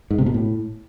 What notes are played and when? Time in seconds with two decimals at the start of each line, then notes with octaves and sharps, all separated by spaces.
0.11 G#2
0.18 C3
0.26 B2
0.34 A2